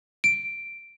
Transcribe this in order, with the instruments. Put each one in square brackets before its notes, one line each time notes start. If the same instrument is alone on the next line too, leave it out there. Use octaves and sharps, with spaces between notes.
[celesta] D7